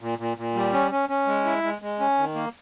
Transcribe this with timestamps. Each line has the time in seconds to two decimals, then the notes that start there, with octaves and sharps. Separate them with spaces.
0.01 A#2
0.18 A#2
0.37 A#2
0.55 G3
0.73 C#4
0.91 C#4
1.09 C#4
1.27 G#3
1.45 E4
1.63 G#3
1.82 G#3
2.00 C#4
2.18 D#3
2.35 A#3